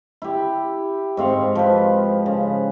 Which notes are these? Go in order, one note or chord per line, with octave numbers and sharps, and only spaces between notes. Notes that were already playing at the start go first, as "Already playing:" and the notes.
E4 G4
G#2 C4 F5 C#6
F3 B4
C#3